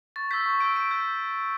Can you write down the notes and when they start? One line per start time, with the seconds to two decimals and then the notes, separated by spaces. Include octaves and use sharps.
0.16 C#6 A6
0.31 E6 G6 B6
0.46 C#6
0.60 E6 G6 D7
0.76 C#6 D7
0.91 G6